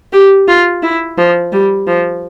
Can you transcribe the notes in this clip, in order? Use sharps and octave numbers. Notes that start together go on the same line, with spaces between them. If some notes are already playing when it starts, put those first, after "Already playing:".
G4
F4
E4
F3
G3
F3